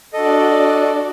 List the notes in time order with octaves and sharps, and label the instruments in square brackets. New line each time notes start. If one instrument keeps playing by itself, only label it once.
[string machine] D4 F#4 D5 [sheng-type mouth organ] A4 D#5